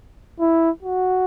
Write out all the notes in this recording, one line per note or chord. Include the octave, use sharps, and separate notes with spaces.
E4
F#4